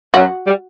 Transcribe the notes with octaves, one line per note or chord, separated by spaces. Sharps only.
F#2 F#3 F#4
G3